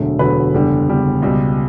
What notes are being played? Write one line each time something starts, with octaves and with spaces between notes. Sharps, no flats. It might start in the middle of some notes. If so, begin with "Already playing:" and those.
Already playing: E1 D2 D3 F#3 A3
E1 D2 D3 F#3 A3 B4 B5
F#1 E2 D3 G3
F#1 E2 D3 G3
C#2 B2 G3